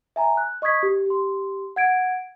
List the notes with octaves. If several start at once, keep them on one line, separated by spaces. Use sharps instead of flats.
E5 G#5 A#5
F#6
D#5 C#6 D#6 G#6 B6
G4
G4 C6
F#5 G#6 D7